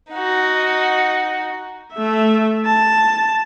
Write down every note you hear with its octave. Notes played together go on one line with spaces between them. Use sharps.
D#4 F#4
A3 E5
A5